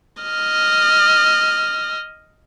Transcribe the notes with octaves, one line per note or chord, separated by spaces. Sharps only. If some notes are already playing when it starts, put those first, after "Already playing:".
D#5 F6